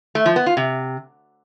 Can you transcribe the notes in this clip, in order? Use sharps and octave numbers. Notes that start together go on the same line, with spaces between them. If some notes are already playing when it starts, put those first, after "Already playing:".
A3
F3
B3
F4
C3